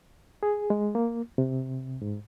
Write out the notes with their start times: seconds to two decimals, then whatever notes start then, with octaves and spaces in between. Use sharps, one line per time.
0.43 G#4
0.70 G#3
0.95 A#3
1.38 C3
2.02 G#2